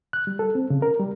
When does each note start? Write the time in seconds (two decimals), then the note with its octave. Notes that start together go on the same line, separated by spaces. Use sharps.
0.13 F#6
0.27 G3
0.39 A4
0.55 C4
0.70 C#3
0.82 A#4
1.00 G3